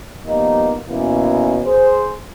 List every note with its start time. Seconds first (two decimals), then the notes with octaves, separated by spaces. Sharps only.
0.26 F3 G3 A#3 B3 D#4
0.89 B2 E3 A#3 C#4
1.65 G#4 C5